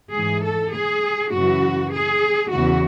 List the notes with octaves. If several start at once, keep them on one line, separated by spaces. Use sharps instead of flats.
G#2 E3 G#4
A4
G#4
F#2 C#3 E3 F#4
G#4
E2 C#3 E3 F#4